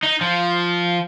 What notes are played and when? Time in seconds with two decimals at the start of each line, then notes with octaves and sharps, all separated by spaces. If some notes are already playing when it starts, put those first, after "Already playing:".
0.03 D#4
0.21 F3